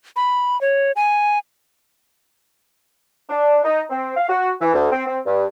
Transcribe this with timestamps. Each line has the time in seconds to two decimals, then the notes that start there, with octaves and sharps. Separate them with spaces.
0.16 B5
0.61 C#5
0.96 G#5
3.29 D4
3.64 D#4
3.90 C4
4.17 F5
4.29 F#4
4.61 E3
4.74 D2
4.92 C4
5.07 C4
5.26 G2